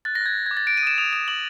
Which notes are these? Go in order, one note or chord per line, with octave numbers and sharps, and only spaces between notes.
F#6 A6
A#6
F#6 G#6
F#6
G#6
D6
A6
F#6 D7
D#7
D#6 E7
D#6 F7
D#6 E7
D6 F#7